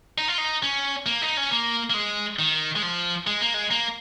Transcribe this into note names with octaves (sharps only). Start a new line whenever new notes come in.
D#4
F4
D#4
C#4
A#3
D#4
C#4
A#3
A#3
G#3
D#3
G#3
F3
G#3
A#3
G#3
A#3